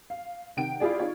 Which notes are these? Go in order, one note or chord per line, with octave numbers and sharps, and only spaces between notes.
F5
C3 D#3 F#5 G5 D7
E4 F4 G4 G#4 D5
D#4 F4 C#5